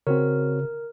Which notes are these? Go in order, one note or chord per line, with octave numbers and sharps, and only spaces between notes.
C#3 C4 F#4 A#4 C#5